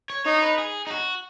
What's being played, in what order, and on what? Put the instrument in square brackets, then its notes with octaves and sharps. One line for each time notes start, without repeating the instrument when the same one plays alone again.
[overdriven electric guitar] C#5
[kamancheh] D#4 [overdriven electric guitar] C#5
[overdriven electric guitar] B4
G#4
D#4
F#4